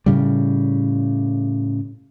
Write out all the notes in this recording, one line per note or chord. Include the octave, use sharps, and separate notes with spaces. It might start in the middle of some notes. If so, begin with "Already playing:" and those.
A2 C#3 G3